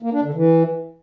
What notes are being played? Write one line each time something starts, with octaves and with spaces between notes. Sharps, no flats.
A#3
D4
D3
E3